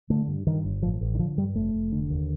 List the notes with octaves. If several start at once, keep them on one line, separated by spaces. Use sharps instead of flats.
D3 A3
G2
G2 D#3
G1
A1 F3
A1
D#3
D3 F3
G2 G3
F1 A3
F1
D3
D#2